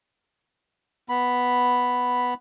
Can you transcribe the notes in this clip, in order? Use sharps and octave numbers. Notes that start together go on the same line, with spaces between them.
B3 B5